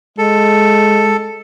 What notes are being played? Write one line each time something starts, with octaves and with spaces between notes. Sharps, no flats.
G#3 A4